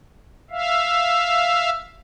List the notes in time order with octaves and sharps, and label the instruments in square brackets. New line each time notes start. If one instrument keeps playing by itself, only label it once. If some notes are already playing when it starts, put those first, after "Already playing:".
[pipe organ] E5 F5